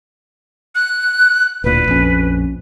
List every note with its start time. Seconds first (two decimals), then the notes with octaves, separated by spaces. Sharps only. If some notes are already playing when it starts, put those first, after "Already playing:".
0.75 F#6
1.64 D1 A#2 B4
1.88 A#1 F2 C#4